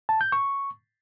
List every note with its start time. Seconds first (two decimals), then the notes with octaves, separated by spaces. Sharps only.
0.09 A5
0.21 G6
0.32 C#6